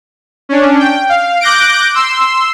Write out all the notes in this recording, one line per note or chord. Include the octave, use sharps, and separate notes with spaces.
C#4 D4
G5
F5
D6 F#6 G6 A#6 D7
C6 E6